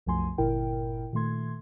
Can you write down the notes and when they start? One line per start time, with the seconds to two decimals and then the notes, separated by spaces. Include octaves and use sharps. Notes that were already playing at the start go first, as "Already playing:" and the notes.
0.06 C2 F#2 F3 A3 G#5 C6
0.38 G1 A#2 E4 A#4 G5
1.13 A#2 D#3 A3 C6 G#6